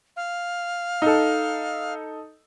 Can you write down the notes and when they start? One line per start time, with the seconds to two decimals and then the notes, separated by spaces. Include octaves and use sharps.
0.16 F5
1.02 D#4 A4